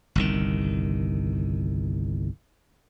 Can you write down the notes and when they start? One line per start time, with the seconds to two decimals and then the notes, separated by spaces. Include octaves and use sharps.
0.15 G1 C2 D#3